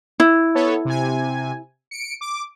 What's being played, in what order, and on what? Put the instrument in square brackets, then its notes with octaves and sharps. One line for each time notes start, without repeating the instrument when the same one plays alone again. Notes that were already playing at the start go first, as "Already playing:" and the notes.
[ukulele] E4
[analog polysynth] B3 A4 C#5
C3 G#5
C#7 D7
D6